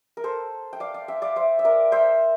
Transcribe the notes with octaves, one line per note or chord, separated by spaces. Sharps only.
A#4
A4 C5
G5
D5 F5
D5 F5
E5 G5
D5 F5
C5 E5
E5
A#4 D5
C5 E5